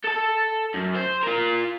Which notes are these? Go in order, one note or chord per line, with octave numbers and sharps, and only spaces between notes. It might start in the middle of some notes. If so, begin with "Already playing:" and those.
A4 A5
F#2
C5
F4 A#4